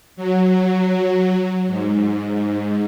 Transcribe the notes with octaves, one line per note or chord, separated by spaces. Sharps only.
F#3
G#2